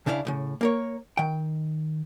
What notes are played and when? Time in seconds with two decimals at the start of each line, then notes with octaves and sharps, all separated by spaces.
0.06 C#2 C#3 D4 E4 G4 F5
0.25 B1 A2 C#3
0.61 A#3 A#4 C#5
1.17 D#3 G5